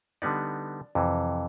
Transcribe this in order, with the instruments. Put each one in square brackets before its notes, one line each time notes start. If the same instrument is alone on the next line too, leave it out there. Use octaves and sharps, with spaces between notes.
[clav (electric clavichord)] D3 G3 B3 D#4 D5
F2 C3 E3